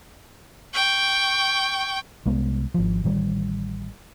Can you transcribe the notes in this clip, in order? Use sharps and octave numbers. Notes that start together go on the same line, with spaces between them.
G5 C#6
C2 G#3 B3
G#1 F3
A1 D#3 G3